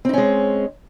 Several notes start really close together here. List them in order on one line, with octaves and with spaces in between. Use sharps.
C4 D#4 C#4 G#3